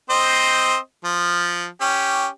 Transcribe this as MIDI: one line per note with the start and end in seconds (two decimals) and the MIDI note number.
0.10 0.76 60
0.10 0.76 72
0.10 0.76 75
1.05 1.66 53
1.81 2.27 61
1.81 2.27 67